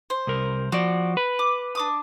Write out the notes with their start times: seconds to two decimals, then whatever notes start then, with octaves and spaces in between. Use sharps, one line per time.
0.10 C5
0.27 C2 A#4
0.72 F3 F#4 D5
1.17 B4
1.39 D6
1.75 D4 D6 D#6